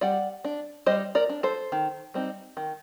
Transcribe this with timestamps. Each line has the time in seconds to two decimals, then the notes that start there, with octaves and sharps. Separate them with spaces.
0.01 G3 D5 F#5
0.44 D4
0.86 G3 C5 D#5
1.15 A#4 D5
1.29 D4
1.43 A4 C5
1.72 D#3
2.14 G3 C4 D#4
2.57 D#3